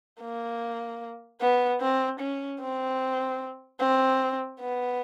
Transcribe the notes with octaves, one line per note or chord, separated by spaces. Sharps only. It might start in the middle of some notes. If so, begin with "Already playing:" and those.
A#3
B3
C4
C#4
C4
C4
B3